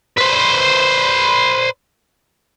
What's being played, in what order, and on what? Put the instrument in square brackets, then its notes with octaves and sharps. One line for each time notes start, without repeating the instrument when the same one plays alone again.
[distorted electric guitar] B4 C5